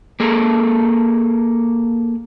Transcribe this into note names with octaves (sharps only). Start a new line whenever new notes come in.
A#3 G#4 A4